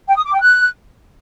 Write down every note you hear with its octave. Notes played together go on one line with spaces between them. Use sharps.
G5
D#6
D6
G5
F#6